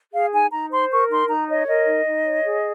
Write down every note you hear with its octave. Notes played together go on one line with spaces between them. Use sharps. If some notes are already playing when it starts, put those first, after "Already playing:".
G#4 F5
D#4 G#5
D#4 A#5
C5 C6
A#4 C#6
D#4 C6
D#4 A#5
C#5 D#5
A#4 D#5
D#4
D#4
C#5
G#4